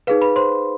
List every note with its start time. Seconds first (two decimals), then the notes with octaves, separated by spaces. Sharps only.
0.07 D#4 G#4 B4 F5
0.22 B4 B5
0.36 C5 C6